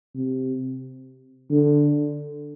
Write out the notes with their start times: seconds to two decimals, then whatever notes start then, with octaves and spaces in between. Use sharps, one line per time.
0.15 C3
1.51 D3